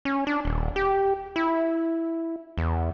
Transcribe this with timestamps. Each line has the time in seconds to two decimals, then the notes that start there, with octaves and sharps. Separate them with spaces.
0.05 C#4
0.27 D4
0.45 D#1
0.76 G4
1.36 E4
2.58 E2